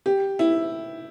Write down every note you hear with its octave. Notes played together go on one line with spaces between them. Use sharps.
G4
E4